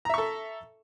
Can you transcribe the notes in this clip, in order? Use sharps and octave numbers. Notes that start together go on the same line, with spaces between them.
A4 E5 A#5 C#6